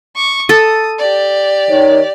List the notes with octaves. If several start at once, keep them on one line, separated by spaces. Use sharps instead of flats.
C#6 D6
A4 D#6
G4 D5
D#3 C#5